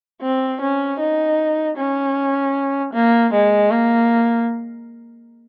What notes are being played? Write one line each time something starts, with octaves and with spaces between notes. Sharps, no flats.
C4
C#4
D#4
C#4
A#3
G#3
A#3